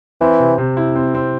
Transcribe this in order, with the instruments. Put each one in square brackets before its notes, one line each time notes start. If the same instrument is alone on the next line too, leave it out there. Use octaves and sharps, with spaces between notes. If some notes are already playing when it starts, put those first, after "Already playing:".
[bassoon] E3 [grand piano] C4
[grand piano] C3
C3
E4
C4
C4